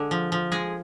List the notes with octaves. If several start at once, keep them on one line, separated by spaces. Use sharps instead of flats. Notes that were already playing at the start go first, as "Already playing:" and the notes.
Already playing: D3 G#3
F3
F3
G#3 G#4